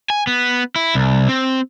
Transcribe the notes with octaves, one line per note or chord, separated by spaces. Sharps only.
G#5
B3
E4
C2
C4